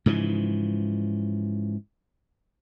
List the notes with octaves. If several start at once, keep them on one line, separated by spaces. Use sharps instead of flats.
G#2 C#3 E3 F3